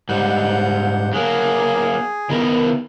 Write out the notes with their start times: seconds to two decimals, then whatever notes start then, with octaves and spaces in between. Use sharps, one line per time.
0.09 G#2 G3 F#5 G6
1.13 F#3 A#3 G#4
2.30 D#3 B3 A#4